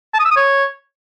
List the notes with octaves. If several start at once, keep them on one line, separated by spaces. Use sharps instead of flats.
A5
D#6
E6
D#6
C#5